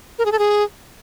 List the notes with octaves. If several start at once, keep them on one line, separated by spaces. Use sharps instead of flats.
A#4
G#4
A4
G#4